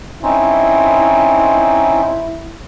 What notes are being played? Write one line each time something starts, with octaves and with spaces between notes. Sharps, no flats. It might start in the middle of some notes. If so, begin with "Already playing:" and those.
C4 C#4 D#4 E4